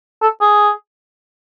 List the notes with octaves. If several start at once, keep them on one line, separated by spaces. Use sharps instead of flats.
A4
G#4